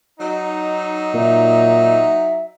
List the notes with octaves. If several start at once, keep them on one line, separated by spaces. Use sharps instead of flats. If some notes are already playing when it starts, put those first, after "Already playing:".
F#3 D#4
A#2 E5